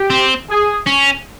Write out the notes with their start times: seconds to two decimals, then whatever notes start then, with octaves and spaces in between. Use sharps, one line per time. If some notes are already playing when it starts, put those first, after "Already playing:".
Already playing: G4
0.10 C4
0.49 G#4
0.86 C#4